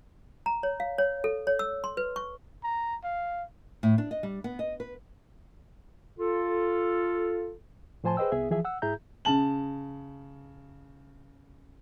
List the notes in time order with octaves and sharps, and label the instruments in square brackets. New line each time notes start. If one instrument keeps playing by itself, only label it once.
[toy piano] A#5
C#5
F5
C#5
A4
C#5
E6
C6
B4
C#6
[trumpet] A#5
F5
[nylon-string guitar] A2
D4
D#5
G3
B3
D#5
B4
[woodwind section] F4 A4
[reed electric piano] A2 F3 C5 G#5 A5 C6
G#4 B4 C5 D#5 G5 E6
C2 B3 G#4 E5
E3 F3 G#4 E5
F#5 E6
G#2 E4 G#4 E5 A#5 G6
[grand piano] C#3 A5 F#7